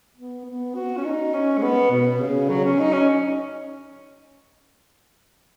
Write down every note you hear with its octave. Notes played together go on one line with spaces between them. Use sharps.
B3
B3
F#4
C#4
D#4
C#4
G#3
B3
B2
C#3
F#3
C#4
D#4
C#4